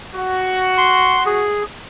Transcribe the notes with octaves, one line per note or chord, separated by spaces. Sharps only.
F#4
C6
G#4